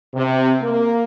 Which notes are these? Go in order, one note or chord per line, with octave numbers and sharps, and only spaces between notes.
C3
A#3